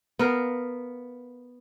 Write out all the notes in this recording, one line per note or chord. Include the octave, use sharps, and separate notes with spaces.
B3 A#4 F5